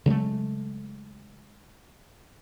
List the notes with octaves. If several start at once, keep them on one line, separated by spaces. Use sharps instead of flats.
C#3 F#3 G#3 A3